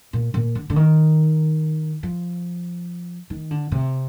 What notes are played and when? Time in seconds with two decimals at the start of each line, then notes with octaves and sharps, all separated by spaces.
0.13 A#2
0.34 A#2
0.55 D3
0.70 D3
0.76 D#3
2.03 F3
3.30 D#3
3.51 D3
3.72 C3